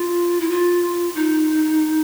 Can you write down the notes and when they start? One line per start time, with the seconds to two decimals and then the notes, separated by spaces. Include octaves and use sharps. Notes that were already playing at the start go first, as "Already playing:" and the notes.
Already playing: F4
0.40 E4
0.49 F4
1.15 D#4